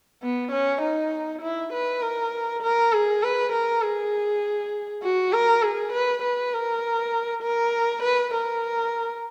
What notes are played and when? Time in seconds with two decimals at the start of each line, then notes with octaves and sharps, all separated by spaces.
0.23 B3
0.52 C#4
0.82 D#4
1.42 E4
1.72 B4
2.02 A#4
2.63 A#4
2.93 G#4
3.23 B4
3.52 A#4
3.82 G#4
5.03 F#4
5.32 A#4
5.62 G#4
5.92 B4
6.22 B4
6.53 A#4
7.43 A#4
8.03 B4
8.34 A#4